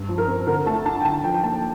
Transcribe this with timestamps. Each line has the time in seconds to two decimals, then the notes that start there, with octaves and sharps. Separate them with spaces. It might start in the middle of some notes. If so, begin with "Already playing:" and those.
Already playing: G2
0.09 F3
0.18 A#4
0.27 C4
0.47 D3 A#4
0.66 A3 A5
0.85 D4 A5
1.01 G5
1.05 D3 A5
1.24 F3 G5
1.34 G5
1.44 A#3 A5